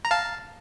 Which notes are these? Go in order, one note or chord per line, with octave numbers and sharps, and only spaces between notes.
A#5
F5 A5